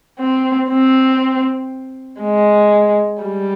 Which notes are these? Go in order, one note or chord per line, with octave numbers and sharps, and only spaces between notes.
C4
C4
G#3
G3